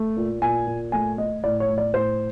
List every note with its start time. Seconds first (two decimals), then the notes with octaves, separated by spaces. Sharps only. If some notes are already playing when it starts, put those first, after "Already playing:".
Already playing: A3
0.17 A#2
0.42 A#2 G#5
0.67 A#2
0.92 A3 G#5
1.18 A3 D#5
1.44 A2 D5
1.60 C#5
1.69 A2
1.78 D5
1.94 A2 C5